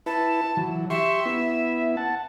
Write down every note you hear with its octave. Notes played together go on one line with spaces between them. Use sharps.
E4 B4 A5
E3 F#3
G4 E5 C6 C#6
B3 E4
F#5 A5